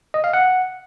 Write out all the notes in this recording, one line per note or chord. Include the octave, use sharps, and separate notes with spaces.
D#5
F5
F#5